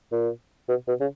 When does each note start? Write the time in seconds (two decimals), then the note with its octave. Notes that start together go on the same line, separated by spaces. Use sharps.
0.12 A#2
0.69 B2
0.88 B2
1.00 C#3